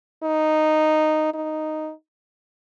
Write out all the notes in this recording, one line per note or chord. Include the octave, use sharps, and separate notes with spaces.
D#4
D#4